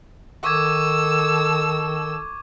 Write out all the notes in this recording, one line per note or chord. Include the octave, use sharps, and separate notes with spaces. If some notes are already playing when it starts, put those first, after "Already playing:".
D#3 A4 C#6 D6 E6 G#6